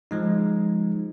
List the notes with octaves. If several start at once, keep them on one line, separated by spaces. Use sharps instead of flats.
F3 G#3 D#4